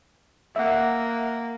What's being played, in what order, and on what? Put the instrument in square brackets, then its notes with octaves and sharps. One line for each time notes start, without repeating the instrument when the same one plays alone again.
[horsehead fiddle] A#3 [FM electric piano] E5 F#5